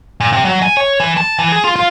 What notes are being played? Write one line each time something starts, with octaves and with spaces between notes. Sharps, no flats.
A#2
C3
F#3
G#5
C#5
E3
A5
E3
G#4
F4
F4